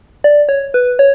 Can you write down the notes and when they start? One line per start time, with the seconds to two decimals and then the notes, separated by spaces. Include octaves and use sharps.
0.24 D5
0.49 C#5
0.74 B4
0.99 C#5